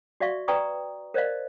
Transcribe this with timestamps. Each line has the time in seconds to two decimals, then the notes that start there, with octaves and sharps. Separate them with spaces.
0.20 F#4 D5 E5 F5 C#6
0.48 B4 D5 G5 A#5 C#6 D#6
1.14 A#4 C5 D5 D#5 F5